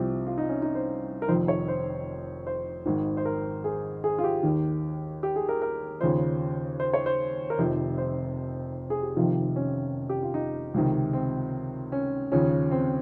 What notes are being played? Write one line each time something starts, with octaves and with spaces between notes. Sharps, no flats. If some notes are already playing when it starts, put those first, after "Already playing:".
Already playing: C2 C3 F3 C4
F4
D#4
C#4
D#4
C5
A#4
F1 F2 D#3 C5
C#5
C5
C5
G#1 G#2 D#3
C5
A#4
G#4
G#4
F4
G4
D#2 D#3
G4
G#4
A#4
A#4
D#2 C#3 F3 C5
C5
C#5
C5
A#4
F1 F2 C3 D#3 C5
C5
G#4
G4
F1 F2 C3 D#3 F4
C#4
G4
F4
D#4
C#2 C3 D#3
C4
C#4
D#2 C#3 F3 C#4
C4